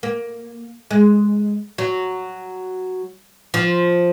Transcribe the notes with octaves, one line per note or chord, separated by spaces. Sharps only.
A#3
G#3
F#3
F3